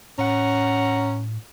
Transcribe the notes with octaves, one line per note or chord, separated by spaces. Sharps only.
A2 C#4 F#5 A#5